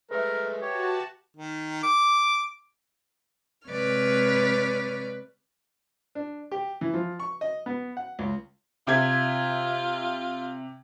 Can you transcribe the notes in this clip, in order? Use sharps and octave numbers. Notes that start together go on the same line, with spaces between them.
G#3 A3 A#4 B4 E5
F#4 G4 C#5 A5
D#3
D6
C3 G#3 B4 C#5 D5 F6
D4
G4
E3
F3
C#6
D#5
B3
F#5
C#2
C3 F4 E5 G#6